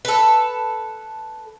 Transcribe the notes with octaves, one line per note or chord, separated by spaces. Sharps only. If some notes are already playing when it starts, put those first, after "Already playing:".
A4 B4